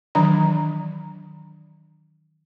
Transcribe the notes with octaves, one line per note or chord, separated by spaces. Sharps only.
D#3 E3 F#3 D4 A#5